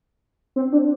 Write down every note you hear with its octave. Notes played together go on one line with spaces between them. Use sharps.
C4
D4